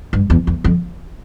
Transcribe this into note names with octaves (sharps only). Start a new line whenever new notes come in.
G2
E2
E2
F2